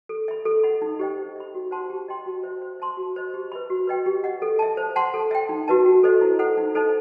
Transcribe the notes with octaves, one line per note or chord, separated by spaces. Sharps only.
A4
E5 B5
A4
D#5 F#5 B5
D#4
G4 C5 D#5 G5
C5
E5 B5
F#4
C5 F#5 A5 C6
G4
D#5 G5 C6
F#4
C5 E5
C5
E5 A5 C6
F#4
C5 D#5
G4
B4 E5 B5
F#4
B4 D#5 G5
G4
D#5 F#5
A4
E5 A5
C5
F#5 A5 C6
A4
E5 G5
D#4
F#4 B4 E5 A5
F#4
A4 C5 D#5
E4
A4 C5 F#5
D#4
A4 C5 D#5 A5